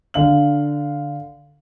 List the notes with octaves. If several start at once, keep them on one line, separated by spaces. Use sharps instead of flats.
D3 F5 F#7